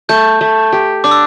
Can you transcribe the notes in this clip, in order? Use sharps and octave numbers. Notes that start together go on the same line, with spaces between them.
A3 G6
A3
G4
D4 D6
E6